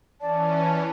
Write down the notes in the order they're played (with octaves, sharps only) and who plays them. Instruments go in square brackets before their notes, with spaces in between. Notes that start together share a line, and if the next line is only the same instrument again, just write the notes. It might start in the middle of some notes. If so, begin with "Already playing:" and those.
[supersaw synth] E3 C#4 [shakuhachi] D5 [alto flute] A5